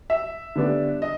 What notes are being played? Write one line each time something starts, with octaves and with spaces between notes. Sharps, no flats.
E5
D3 G3 B3 D4
D#5